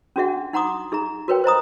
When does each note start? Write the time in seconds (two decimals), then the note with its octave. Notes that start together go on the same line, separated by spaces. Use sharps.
0.16 C#4 D4 F#4 G#4 E5 F#5
0.53 D#4 F#5 A#5 C6 D6 D#6
0.92 D#4 G#4 E5 A#5
1.28 F#4 A#4 B4 C#5 G5
1.44 C5 D#5 A#5 D#6